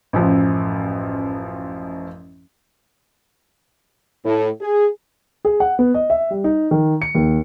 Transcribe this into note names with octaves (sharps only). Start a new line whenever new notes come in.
A1 F#2 F3
A2
G#4
G#4
F#5
B3
D#5
E5
G3
D#4
D#3
C#7
D#2